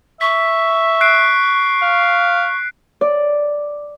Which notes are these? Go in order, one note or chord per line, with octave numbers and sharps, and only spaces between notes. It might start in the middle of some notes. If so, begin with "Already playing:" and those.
E5 C#6 B6
F#6 C7 D7
F5
D5